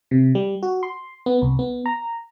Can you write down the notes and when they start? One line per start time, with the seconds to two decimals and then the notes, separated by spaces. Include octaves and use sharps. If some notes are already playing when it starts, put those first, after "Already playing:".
0.11 C3
0.35 G3
0.63 F#4
0.83 C6
1.26 B3
1.42 C2
1.59 B3
1.86 A#5